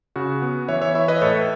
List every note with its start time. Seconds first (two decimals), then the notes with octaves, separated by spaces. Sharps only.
0.16 C#3 F#4
0.42 B3
0.68 E3 C#5 E5
0.81 C#5 E5
0.95 E4 C#5 E5
1.08 B4 D#5
1.22 A2 A4 C#5